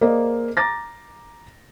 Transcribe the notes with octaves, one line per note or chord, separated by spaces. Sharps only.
A#3 G#4 C5 D5 D#5
A#5 D6 A6 A#6